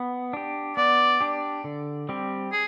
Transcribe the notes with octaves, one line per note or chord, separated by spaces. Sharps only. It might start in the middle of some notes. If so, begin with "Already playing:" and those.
Already playing: B3
D4 G4
B3 D5
D4 G4
D3
G3 C4 G4
G#4